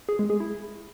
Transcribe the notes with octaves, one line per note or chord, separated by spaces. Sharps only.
G#4
G#3
G#4
E4